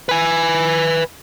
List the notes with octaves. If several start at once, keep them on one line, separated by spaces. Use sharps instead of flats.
B4 G#5